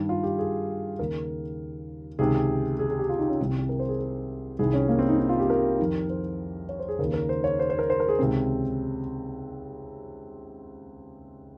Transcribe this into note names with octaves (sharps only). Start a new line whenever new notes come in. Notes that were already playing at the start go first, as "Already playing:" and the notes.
Already playing: G2 D#3
F4
G4
G#4
D#2 C#3 A#4
C#2 C3 D#3 G#4
G#4
G#4
G4
F4
D#4
C#4
C2 C3 D#3
C4
G4
A#4
C5
G#4
G#4
C2 C3 D#3 G#4
C#4
A#3
C4
D#4
D#4
F4
G4
A#4
F2 D#3
C5
C#5
C5
G#4
D#2 C#3 A#4
A#4
C5
C#5
C5
C5
A#4
C5
A#4
G#4
C#2 C3 D#3 C4